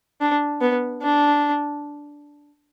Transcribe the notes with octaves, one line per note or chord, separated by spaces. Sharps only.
D4
B3
D4